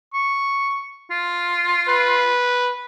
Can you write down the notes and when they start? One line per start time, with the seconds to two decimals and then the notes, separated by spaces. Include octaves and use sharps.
0.13 C#6
1.11 F4
1.88 B4